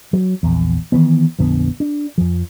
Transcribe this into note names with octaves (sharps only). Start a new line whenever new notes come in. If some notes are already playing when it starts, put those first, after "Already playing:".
F#3
A#1 E2
D#3 E3 B3
A#1 F2 D3 B3
D4
F2 F3